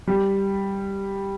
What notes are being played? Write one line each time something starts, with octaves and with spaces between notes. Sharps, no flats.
G3